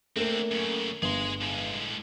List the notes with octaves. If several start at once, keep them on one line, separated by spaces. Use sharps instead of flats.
D3 A3 A#3 C4 A4
F#2 C#3
G1 G#4 C6
A2 G#3